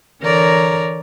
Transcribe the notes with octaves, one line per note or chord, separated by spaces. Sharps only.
D3 E3 A#4 C#5 D5 A#5